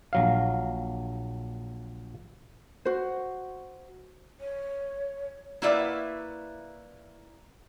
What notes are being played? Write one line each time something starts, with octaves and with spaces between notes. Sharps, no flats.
A#1 F#3 F5
F#4 C5
C#5
A#3 E4 F#4 B4 D5 E5